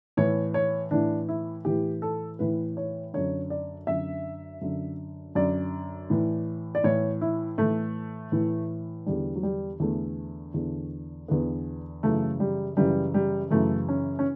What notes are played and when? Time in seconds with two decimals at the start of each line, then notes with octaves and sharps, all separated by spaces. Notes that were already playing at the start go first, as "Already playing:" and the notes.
0.17 A2 E3 C#5
0.54 C#5
0.91 A2 E3 D4
1.28 E4
1.65 A2 E3 G4
2.02 A4
2.39 A2 E3 B4
2.77 C#5
3.14 F#2 D3 C#5
3.50 D5
3.87 F#2 D3 E5
4.61 F#2 D3
5.35 F#2 D3 D5
6.10 A2 E3
6.75 D5
6.84 A2 E3 C#5
7.21 E4
7.58 A2 E3 A3
8.32 A2 E3
9.06 E2 D3 G3
9.36 F#3
9.43 G3
9.80 E2 D3 A3
10.54 E2 D3
11.28 E2 D3 B3
12.03 F#2 C#3 E3 A3
12.40 G3
12.77 F#2 C#3 E3 G3
13.14 G3
13.51 F#2 C#3 E3 A3
13.88 C#4
14.19 C#4